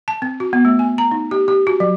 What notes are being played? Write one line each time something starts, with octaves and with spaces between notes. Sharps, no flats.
A5
C4
F#4
B3
A3
G#5
A#5
D#4
G4
G4
F#4
F#3